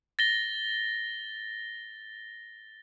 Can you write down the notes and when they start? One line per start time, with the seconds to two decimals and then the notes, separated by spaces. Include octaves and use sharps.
0.19 A6 A#6 G7